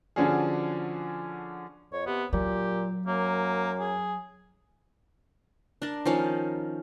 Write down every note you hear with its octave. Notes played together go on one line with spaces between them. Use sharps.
D3 F3 C#4 D4 F#4 G#4
F2 C#5
C3 B3
A#2 F#3 G4
F#2 A#3
G#4
D4 A#4 A5
D#3 F3 C#4 F5